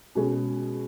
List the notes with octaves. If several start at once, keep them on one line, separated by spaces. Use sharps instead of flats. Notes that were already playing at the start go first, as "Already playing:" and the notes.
B2 G#3 C#4 G#4